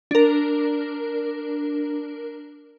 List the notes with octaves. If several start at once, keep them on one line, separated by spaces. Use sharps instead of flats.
D4 A#4